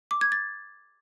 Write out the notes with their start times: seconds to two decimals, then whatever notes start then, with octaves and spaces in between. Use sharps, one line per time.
0.11 D6
0.21 G#6
0.32 A6